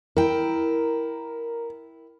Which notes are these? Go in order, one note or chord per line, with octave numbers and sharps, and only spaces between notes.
E4 A#4 G5